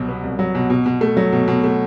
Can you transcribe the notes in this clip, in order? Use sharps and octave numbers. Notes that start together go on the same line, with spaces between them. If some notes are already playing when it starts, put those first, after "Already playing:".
Already playing: C2 B2 F#3
B3
C2
F#3
B2
B2
B2
A3
F#3
B2
B2
A3